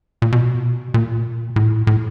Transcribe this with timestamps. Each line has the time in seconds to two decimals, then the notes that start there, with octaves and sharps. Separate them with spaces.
0.22 A#2
0.32 B2
0.94 A#2
1.56 A2
1.87 A2